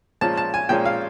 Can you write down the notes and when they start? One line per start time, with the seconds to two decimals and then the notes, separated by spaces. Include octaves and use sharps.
0.21 A#2 F3 G#3 C#4 A5
0.37 A5
0.54 G#5
0.69 A#2 F3 G#3 C#4 G5
0.85 F5